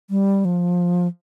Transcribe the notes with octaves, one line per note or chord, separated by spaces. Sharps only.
G3
F3